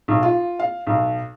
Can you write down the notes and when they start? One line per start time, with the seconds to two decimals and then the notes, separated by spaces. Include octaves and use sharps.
0.08 B1
0.23 F4
0.59 F5
0.87 B1